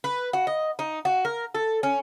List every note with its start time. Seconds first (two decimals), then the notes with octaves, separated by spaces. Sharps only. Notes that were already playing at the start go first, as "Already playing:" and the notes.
0.04 B4
0.33 F#4
0.47 D#5
0.79 D#4
1.05 F#4
1.25 A#4
1.55 A4
1.83 C#4